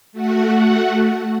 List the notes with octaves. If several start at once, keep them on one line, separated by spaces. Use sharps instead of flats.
A3 F#4 F#5